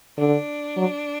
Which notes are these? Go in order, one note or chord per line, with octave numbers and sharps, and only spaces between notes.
D3 D4
F#3